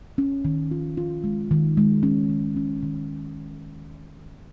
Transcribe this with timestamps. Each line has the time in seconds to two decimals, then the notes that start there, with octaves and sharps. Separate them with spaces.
0.18 C#4
0.45 D#3
0.71 F4
0.97 F4
1.24 G#3
1.51 D#3
1.77 G#3
2.03 C#4
2.30 D#3
2.57 C#4
2.83 D#3